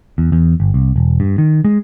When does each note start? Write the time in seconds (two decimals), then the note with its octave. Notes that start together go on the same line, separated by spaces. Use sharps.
0.18 E2
0.32 E2
0.60 G1
0.74 C2
0.96 E1
1.20 G2
1.38 D#3
1.65 G#3